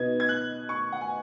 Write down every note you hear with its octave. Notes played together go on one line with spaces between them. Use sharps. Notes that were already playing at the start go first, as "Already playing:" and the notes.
Already playing: B2 B3 D#4 G#6
G#6
F#6
C#6
F#5
G#5